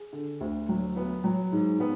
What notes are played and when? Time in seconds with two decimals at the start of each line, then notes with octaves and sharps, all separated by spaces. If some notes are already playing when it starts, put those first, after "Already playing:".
Already playing: G#4
0.13 D3
0.41 D2
0.69 F#3
0.96 B3
1.24 F#3
1.52 G#2
1.80 B3